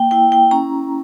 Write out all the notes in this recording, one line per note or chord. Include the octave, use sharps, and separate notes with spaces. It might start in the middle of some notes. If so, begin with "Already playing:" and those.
Already playing: A#3 G5
E4 G5
G5
C#4 A#5